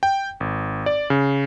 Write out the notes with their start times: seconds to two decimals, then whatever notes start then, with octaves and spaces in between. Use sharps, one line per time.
0.03 G5
0.40 G#1
0.86 D5
1.10 C#3